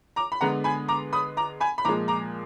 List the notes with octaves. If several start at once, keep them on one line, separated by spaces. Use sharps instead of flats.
A#5 D6
B5
D3 G#3 B3 F#5 A#5
G#5 B5
A#5 D6
B5 D#6
A#5 D6
G#5 B5
B5
A#2 F3 G#3 A#5 D6
A#5 D6